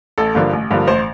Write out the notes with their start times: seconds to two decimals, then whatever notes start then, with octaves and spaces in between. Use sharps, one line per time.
0.18 A1 A4
0.35 G2 D3 F3 A#3
0.53 A1
0.71 G2 D3 F3 A#3
0.87 A1 C5